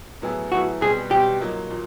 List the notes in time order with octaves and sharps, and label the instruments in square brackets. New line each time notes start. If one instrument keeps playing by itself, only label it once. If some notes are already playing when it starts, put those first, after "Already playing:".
[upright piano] A2 F#3 B3 E4 G#4
[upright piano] A2 F#3 B3 E4 G#4 [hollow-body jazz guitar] F#4
[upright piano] B2 G3 C4 [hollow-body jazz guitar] G#4
[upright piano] B2 G3 C4 [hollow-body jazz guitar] G4
[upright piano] A#2 F#3 A#3 D#4
A#2